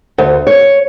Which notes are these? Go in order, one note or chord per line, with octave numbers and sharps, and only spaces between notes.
D2
C#5